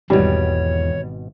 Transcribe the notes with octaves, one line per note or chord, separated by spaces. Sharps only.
G#1 E2 B2 G3 C#5